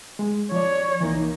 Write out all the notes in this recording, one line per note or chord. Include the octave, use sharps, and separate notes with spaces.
G#3
F3 C#5 D5
C2 E3 A#3 D#4